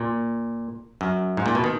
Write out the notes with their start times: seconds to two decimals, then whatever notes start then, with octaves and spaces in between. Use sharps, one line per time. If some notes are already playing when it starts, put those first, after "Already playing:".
Already playing: A#2
1.01 F#2
1.37 G#2
1.46 A#2
1.55 B2
1.64 D#3